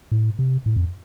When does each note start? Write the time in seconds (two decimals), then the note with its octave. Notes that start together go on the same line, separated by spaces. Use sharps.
0.12 A2
0.39 C3
0.66 A2
0.76 F2